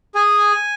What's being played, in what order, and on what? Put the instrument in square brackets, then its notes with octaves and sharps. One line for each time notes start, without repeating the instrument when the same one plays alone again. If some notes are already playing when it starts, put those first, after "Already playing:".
[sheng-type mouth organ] G#4 G#5